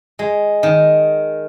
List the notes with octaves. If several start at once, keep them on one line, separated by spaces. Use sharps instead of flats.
G#3
D#3